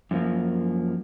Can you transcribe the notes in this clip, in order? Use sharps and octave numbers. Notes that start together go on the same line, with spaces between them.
F#2 F3 A#3